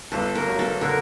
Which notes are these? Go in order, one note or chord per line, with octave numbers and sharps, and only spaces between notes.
G1 A4
A#4
F#3
A4
D3 A#4